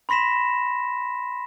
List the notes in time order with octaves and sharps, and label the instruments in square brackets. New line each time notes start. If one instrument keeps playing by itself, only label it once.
[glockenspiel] B5 C6 A#6 B6 E7